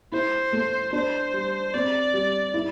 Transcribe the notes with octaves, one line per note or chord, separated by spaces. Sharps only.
E4 C5
A3
D4 C5
G3
C4 D5
G3
E4